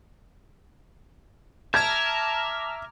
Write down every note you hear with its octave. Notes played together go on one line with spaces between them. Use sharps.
E5 A5 A#5 D6 F6 G#6